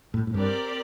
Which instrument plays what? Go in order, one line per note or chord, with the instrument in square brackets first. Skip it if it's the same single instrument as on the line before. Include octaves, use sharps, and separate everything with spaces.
[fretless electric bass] A2
A2
[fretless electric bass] G2 [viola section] C4 G4 A#4 D5